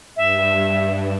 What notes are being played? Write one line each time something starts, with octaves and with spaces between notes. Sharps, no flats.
G2 E5